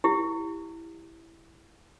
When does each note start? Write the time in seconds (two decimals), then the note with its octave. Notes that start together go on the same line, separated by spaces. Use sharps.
0.04 E4 G4